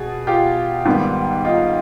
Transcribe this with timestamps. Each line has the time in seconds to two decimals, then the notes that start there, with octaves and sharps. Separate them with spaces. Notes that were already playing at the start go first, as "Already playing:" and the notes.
Already playing: B2 G#4
0.27 F4 G4
0.85 G#2 D#3 G3 B3
1.45 D#4 F4